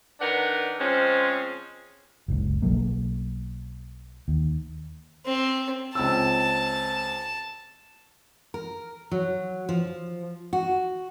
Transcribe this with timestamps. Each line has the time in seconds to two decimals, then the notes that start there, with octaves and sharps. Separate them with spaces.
0.20 D#3 D4 A#4 B4 F#5
0.79 F3 G#3 C4 C#4
2.28 F#1 C#2
2.62 B1 F#3 A#3
4.28 D#2
5.25 C4
5.95 C#2 C4 A5 E6
8.54 A#4
9.11 F#3
9.69 F3
10.53 F#4